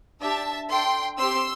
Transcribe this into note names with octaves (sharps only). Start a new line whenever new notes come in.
D4 G4 E5 A5
D4 A4 G5 C6
C4 G4 C6 E6